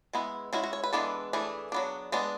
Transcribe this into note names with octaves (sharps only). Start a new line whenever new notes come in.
G#3 B3 E4
G#3 C#4 E4 F#4
F#4
C#5
B4
E3 G#3 B3 D4 A4
E3 A3 D4 G#4
F#3 B3 D4
G#3 B3 D4